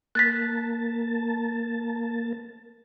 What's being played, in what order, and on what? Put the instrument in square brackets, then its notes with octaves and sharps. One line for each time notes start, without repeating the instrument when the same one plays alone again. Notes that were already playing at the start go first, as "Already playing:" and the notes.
[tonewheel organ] A#3 A5 [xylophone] F#6 A6 B6